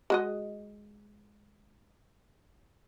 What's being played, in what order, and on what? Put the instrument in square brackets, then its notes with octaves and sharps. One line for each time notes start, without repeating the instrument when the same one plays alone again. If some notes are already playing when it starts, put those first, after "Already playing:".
[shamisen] G#3 F#4 D#5